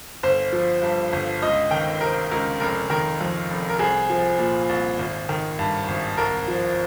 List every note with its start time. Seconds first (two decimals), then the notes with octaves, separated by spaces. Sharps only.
0.23 G1 C5
0.53 F3
0.82 G2
1.13 G1
1.42 C#2 D#5
1.71 D#3 G5
2.01 C3 A#4
2.31 C#2 A#4
2.60 F1 A#4
2.90 D#3 A#4
3.21 F2
3.51 F1
3.70 A#4
3.79 C2 G#4
4.10 F3
4.39 A#2
4.69 C2
4.99 G#1
5.29 D#3
5.59 G2
5.88 G#1
6.17 C2 A#4
6.48 F3